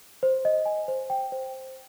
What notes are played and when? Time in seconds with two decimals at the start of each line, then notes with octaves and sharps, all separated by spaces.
0.23 C5
0.45 D#5
0.66 G#5
0.88 C5
1.10 G5
1.32 C5